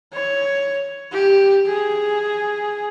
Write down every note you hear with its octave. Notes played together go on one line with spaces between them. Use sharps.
C#5
G4
G#4